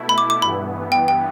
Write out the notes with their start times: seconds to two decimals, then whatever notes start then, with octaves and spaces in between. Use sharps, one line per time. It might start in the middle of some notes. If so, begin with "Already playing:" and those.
Already playing: B2 A3 E4
0.09 B5
0.18 D6
0.30 D6
0.42 G2 E3 B3 B5
0.92 G5
1.08 G5